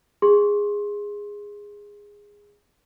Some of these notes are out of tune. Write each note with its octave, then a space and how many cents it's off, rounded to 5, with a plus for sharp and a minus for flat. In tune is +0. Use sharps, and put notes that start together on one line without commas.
G#4 -15 C6 +25